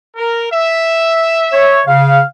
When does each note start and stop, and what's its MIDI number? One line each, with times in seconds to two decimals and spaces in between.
0.17 0.48 70
0.51 1.83 76
1.52 1.81 73
1.87 2.21 49
1.87 2.21 77